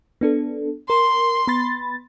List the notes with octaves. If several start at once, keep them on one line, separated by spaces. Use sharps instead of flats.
B3 D4 A4
A#4 C6
B3 B5 A6